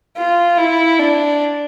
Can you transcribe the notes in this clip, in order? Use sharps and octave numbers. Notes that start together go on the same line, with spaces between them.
F4
E4
D4